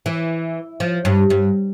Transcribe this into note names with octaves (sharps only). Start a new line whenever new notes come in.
E3
F3
G2
G2